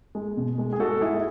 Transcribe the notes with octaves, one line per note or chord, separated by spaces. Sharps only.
G#3
B2
G#3
G#4
G#3 F#4 A4
G#3 E4 G#4
E4